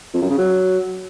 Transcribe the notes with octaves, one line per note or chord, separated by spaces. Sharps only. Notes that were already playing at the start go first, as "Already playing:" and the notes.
F2
F#2
C#3
F#3